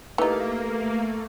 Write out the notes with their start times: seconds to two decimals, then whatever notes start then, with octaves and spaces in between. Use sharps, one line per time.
0.18 E3 A3 A#3 D#4 G4 B4